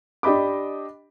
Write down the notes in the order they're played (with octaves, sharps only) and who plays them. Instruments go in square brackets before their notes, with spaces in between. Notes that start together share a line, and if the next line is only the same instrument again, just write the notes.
[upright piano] D4 G4 D#5 B5 D6